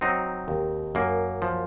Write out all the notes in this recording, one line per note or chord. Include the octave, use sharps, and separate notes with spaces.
F#3 C4 D#4
D#2
F#2 A#3
F3